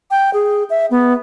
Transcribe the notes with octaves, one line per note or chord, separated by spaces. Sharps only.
G5
G#4
E5
B3